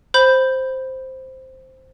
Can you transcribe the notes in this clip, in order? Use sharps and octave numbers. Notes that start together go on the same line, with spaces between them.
C5 B5 G6